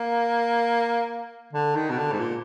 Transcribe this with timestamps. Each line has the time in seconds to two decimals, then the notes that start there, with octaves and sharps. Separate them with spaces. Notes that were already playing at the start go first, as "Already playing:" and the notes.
Already playing: A#3
1.53 D3
1.75 D#3
1.90 B2
1.98 D3
2.12 G#2
2.20 A#2